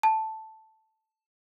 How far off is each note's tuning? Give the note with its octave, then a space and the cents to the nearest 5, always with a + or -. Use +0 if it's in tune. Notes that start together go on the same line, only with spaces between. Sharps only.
A5 +0